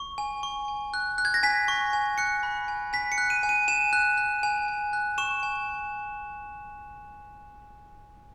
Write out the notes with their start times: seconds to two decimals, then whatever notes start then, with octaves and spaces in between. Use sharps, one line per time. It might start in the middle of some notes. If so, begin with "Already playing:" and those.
Already playing: C#6
0.18 G#5
0.43 C#6
0.68 G#5
0.94 F#6
1.18 F#6
1.25 G#6
1.34 A#6
1.43 G#5 B6
1.68 C#6
1.93 G#5
2.18 F#6 C#7
2.43 B5
2.68 G#5
2.93 G#5 B6
3.12 C#7
3.18 F#6
3.30 D#7
3.43 G#5
3.49 D#7
3.68 G#5 E7
3.93 F#6
4.18 F#6
4.43 G#5
4.68 G#5
4.93 F#6
5.18 C#6 E7
5.43 G#5